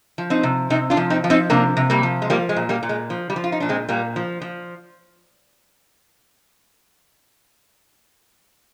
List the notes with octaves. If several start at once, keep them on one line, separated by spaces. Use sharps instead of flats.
F3
C4 D#4
C3
C3 C4 D#4
D4 F4
F3
C4 D#4
F3
C4 D#4
C3 A#3 D4
C3
G3 A#3
F3
G#3
F3 G3 A#3
G#3
A#2
G3 A#3
A#2
G#3
F3
G3
F3
F4
D#4
A#2 D4
G#3 C4
A#2 G3 A#3
F3
F3